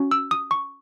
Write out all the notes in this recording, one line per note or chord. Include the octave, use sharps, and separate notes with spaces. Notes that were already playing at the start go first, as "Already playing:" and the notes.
Already playing: C#4 F#4
E6
D#6
C#6